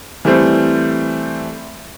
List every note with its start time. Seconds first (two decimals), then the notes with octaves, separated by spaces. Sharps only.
0.25 E3 G3 A3 C4